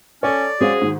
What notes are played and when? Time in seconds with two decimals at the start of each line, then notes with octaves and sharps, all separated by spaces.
0.23 C#4 A4 C#5 D5
0.61 G#3 C#4 F#4 G#4 C5 F5
0.82 G#2 D#3 F#4